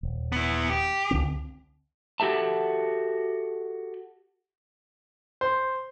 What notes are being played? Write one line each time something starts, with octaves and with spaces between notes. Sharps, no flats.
D#1
B3 E4
G4
C#2 D3 C4
F#4 G4 A4 E5 A5
C5